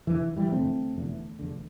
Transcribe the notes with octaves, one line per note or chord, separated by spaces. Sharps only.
F1 E2 D3 E3
E3 G3
F1 E2 D3 A3 C4
F1 E2 D3
F1 E2 D3